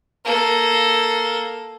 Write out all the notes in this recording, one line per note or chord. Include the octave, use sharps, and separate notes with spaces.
A#3 A4